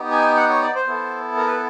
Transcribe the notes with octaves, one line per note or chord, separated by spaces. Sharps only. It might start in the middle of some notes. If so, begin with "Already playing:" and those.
Already playing: B3 D#4 G4
G#5
F#5
C#5
D5
C5
B3 E4 A4
A#4
B4